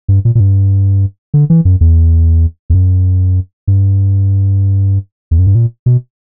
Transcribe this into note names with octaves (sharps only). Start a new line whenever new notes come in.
G2
A#2
A#2
G2
D3
E3
F#2
E2
E2
F#2
G2
E2
F#2
G2
A#2
B2